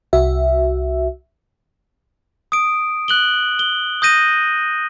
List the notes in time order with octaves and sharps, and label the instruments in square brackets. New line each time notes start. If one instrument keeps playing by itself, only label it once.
[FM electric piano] C2 F#4 E5
[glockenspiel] D#6 D7
F#6 F#7 G7
G7
D#6 G6 A#6 D#7